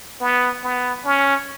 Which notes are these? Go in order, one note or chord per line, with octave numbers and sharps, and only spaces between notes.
B3
B3
C#4